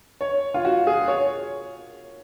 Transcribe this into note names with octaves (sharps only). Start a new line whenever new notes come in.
C#5
F4
F#4
G#4
C#5